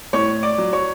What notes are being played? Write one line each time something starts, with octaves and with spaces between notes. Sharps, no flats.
A2 C#5 C#6
D5 D6
F#3
C#5 C#6